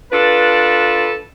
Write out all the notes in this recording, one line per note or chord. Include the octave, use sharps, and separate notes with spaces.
D4 F4 A4 B4